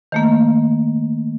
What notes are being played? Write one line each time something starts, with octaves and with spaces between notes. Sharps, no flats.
D#3 A3 A#3